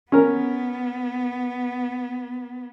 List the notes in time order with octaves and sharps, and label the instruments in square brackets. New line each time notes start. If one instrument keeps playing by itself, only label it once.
[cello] B3 [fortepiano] C#4 A#4